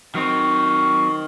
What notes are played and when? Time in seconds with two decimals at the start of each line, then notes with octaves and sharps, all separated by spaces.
0.15 D#3 F#3 C4 C#6